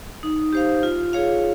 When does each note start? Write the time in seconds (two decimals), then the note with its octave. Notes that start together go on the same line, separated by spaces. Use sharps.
0.23 D#4
0.53 G4 C5 F5
0.83 F4
1.13 G#4 C#5 F5